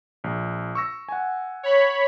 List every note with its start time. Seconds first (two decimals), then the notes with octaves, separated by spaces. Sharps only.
0.24 A#1
0.75 C#6 E6 A#6
1.09 F#5 G#5
1.63 C#5 B5